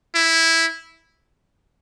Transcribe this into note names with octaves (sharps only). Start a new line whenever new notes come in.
E4